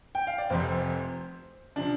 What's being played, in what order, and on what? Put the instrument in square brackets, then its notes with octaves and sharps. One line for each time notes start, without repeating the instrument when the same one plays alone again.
[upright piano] G5
F5
D5
F1 F2 C3 C5
C3 F3 D4